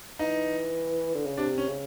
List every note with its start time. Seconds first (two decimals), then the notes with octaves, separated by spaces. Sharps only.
0.19 E3 D#4
1.15 D3
1.26 C#3
1.37 C3 D4
1.58 C#4
1.68 C#3